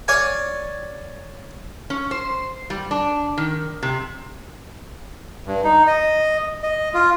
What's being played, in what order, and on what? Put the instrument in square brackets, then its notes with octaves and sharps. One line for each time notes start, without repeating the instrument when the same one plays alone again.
[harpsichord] C#5 D5 F5 G#5
[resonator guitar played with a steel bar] C#4
C5
G3
D4
D#3
C3
[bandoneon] G2
D#4
D#5
D#5
F4